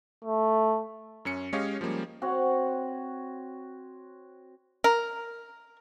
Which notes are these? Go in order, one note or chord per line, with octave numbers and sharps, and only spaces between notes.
A3
F#2 C#4 C#7
G#3 C#4 G4 C#5 D#5 F5
F3 G3 G#3 A#3 C#4
C4 F#4 C#5 F#5
A#4